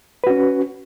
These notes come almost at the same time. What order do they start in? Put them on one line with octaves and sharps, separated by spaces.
B4 F#4 C#4